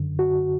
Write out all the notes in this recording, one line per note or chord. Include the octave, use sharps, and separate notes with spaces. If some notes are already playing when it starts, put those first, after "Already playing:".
Already playing: F#2 D3
F#4